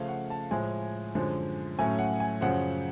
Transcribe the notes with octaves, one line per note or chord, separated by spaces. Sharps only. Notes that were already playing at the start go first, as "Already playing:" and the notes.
Already playing: C#3 F3 A3 C#4 F5
F#5
A5
A2 F3 G#3 G#5
F#2 D3 F3 G#3
A2 F#3 A3 C#4 G#5
F#5
G#5
F#2 C#3 F3 F#5